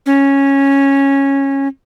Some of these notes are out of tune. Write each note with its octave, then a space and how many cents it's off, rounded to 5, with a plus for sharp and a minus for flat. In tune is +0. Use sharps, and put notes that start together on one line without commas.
C#4 -10